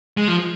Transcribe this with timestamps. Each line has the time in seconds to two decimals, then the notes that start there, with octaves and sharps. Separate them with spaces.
0.17 G#3
0.28 F3